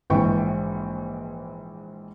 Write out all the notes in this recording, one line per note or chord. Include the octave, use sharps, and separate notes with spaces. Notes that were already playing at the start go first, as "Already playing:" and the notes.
A#1 G#2 E3 G5 C#6